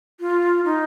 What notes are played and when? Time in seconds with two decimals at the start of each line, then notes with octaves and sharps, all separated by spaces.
0.20 F4
0.65 D#4